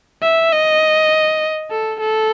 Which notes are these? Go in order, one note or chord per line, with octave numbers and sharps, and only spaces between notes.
E5
D#5
A4
A4